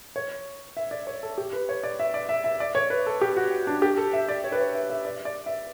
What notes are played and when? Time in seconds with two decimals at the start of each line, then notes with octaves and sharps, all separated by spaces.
0.16 C#5
0.77 E5
0.91 D5
1.07 C#5
1.23 A4
1.38 G4
1.53 B4
1.69 C#5
1.83 D5
1.99 E5
2.14 D5
2.29 E5
2.44 E5
2.60 D5
2.75 C#5
2.90 B4
3.07 A4
3.21 G4
3.36 F#4
3.67 D4
3.82 G4
3.97 A4
4.13 E5
4.28 D5
4.44 C#5
4.52 B4
4.60 C#5
4.75 E5
4.90 E5
5.05 D5
5.25 D5
5.46 E5